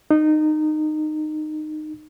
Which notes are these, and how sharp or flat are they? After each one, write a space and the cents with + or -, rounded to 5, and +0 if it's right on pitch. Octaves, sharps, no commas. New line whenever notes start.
D#4 -20